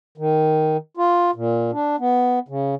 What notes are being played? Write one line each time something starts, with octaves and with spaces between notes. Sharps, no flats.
D#3
F4
A#2
D4
B3
C#3